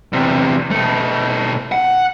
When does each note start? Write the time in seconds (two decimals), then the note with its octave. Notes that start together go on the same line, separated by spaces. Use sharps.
0.13 E2 C3
0.71 B2 A3
1.72 F#5